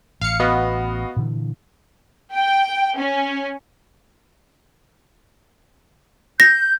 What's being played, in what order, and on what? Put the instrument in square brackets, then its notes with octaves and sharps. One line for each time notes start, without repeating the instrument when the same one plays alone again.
[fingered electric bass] A1 [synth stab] F5 C#7
[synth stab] B3 [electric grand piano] F#4 D#5 F5
[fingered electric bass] A#2 D3 E3
[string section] G5
C#4
[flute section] G6 [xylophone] A#6